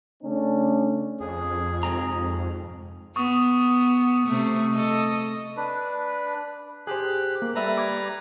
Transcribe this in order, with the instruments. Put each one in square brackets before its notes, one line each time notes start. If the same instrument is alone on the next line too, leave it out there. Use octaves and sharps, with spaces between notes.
[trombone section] C#3 A3 C#4 D4
[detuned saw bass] F2 [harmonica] G#4
[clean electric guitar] G#2 C3 A#5
[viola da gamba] B3 [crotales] C#6 D#6
[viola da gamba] C3 A3
A4 D#5
[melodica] D4 B4
[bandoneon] G4 F#6 [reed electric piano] G#4 C5
[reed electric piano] A#3
[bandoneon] G3 B4 A#5 [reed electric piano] A4 E5
[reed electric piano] D6 G#6